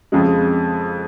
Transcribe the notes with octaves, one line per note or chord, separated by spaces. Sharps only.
F2 C#3 G#3